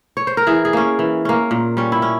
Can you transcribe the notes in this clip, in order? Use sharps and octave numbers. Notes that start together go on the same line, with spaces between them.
C#5
C5
A#4
E3 G#4
G#4
A#3 C#4
E3
A#3 C#4
A#2
G3 C#4
E4
C#4